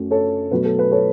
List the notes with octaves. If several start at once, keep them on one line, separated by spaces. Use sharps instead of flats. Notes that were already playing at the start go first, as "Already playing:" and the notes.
Already playing: F#2 F#3 A3
A4 C#5
B2 F#3 A3 B4
A4
B4
A4 C#5